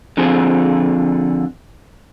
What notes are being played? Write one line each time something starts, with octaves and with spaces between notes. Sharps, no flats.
D3 F3 C4 G#4